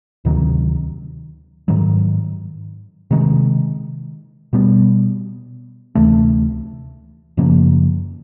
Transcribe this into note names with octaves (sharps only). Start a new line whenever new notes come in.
D2 C3 D#3 F#3
G#2 D#3 F#3
C3 D#3 G#3
B2 G3 B3
D2 C3 E3 A3
F#2 C#3 F3 A#3